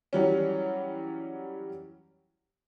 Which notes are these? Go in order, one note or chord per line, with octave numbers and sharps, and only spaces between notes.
E3 F#3 G3 C#4